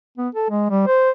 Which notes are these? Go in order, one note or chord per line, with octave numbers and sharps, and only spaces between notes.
B3
A4
G#3
G3
C5